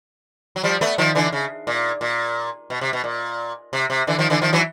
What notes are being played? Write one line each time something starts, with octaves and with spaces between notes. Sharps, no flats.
F#3
F3 G3
A3 B3
D#3 F3
D3 E3
C#3
A#2
A#2
B2
C3
B2
A#2
C3
C3
D3 E3
D#3 F3
D3 E3
D#3 F3
E3 F#3